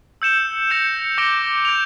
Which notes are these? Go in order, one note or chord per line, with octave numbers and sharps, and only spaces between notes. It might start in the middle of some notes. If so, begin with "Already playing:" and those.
E6 G6 C#7 E7 G7
G6 A#6 C#7 F7
D6 G6 A#6 D7 G7
G6 D7 F7